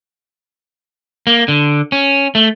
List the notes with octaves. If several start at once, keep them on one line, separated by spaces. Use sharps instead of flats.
A#3
D3
C#4
A3